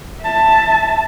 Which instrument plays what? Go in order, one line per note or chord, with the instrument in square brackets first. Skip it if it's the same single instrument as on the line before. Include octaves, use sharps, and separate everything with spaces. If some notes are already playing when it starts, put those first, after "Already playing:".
[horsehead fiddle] E5 A5